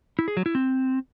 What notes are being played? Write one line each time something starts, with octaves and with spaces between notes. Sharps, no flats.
E4
G#4
F#3
E4
C4